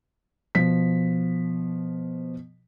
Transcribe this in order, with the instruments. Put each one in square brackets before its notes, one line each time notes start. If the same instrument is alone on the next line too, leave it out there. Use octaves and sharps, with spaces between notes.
[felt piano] B2 F3 B6